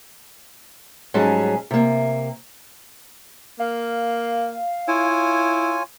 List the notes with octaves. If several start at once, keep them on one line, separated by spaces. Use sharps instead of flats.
G#2 F#3 G3 C#4 G#4 A5
C3 A#3
A#3 F5
E4 F4 C#5 G#5